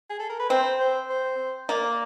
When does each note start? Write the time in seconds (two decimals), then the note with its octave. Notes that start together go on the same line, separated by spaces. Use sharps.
0.10 G#4
0.19 A4
0.29 A#4
0.39 B4
0.50 C4 C5
0.80 C5
1.10 C5
1.69 A#3 D5